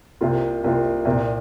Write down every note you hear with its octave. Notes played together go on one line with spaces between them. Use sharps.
C2 C3 A#3 F4
C2 C3 A#3 F4
C2 A#2 A#3